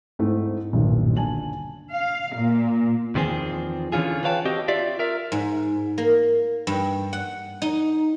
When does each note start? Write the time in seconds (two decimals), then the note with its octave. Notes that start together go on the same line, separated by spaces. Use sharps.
0.19 G#2 A3 C4 E4
0.72 D#1 B1 G2 D#3
1.17 D3 G#5 A5 F#7
1.91 F5
2.34 A#2
3.15 E2 D#3 F3 C4 G#4
3.92 D3 E3 C#4 F4 G#4
4.24 B4 C#5 F5 G5 A5
4.45 C4 F#4 G4 D#5
4.68 F4 G4 D5 E5
4.99 A#4 E5
5.32 G#2
5.98 A#3
6.67 G2
7.13 F#5
7.62 D#4